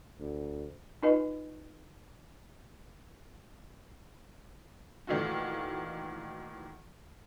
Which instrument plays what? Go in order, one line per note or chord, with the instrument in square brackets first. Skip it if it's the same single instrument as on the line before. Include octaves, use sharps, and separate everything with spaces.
[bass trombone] D2
[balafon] D#4 F4 B4 D#5 G#5
[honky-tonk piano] A#2 D#3 E3 A3 F4 F#4